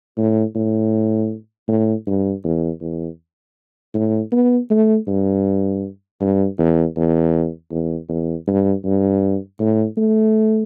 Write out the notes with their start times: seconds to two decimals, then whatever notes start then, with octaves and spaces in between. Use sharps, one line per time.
0.17 A2
0.55 A2
1.68 A2
2.07 G2
2.44 E2
2.81 E2
3.94 A2
4.32 B3
4.70 A3
5.07 G2
6.21 G2
6.59 E2
6.96 E2
7.71 E2
8.09 E2
8.47 G2
8.84 G2
9.59 A2
9.97 A3